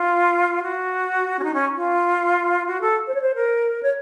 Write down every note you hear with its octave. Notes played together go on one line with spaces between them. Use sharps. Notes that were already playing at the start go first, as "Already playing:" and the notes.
Already playing: F4
F#4
C#4
D#4
C#4
F4
F#4
A4
C5
C#5
C5
A#4
C#5